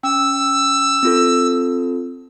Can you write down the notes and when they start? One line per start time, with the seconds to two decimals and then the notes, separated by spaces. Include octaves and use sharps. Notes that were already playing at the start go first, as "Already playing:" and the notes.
0.03 C#4 G5 E6
1.03 C4 F4 A4